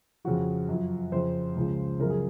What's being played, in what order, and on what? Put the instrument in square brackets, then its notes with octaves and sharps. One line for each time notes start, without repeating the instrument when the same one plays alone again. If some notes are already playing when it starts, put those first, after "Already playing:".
[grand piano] F2 C#3 F3 F#4
F#2 F3
F2 C#3 F3 C5
C#2 C#3 F3
F#2 C#3 F3 A#4
G#4